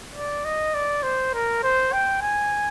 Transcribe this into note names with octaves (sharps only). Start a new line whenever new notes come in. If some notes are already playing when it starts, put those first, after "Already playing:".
D5
D#5
D5
C5
A#4
C5
G5
G#5